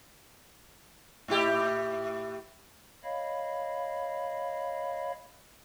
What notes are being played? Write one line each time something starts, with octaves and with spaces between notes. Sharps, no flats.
A2 E4 G4
C#5 D#5 F5 B5